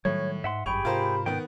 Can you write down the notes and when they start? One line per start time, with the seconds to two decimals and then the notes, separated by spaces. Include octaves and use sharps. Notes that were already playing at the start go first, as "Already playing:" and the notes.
0.05 A2 D#3 F#3 G3 C#5
0.44 G#2 E5 F#5 C6
0.66 G1 F#2 G4 G#4 G5 B5 C#6 F7
0.85 G#2 C3 F4 A#4 C5
1.26 D#3 B3 G5